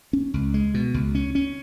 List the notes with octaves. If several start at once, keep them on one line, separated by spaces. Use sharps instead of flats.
C#4
C#2
G#3
B2
C#2
C#4
C#4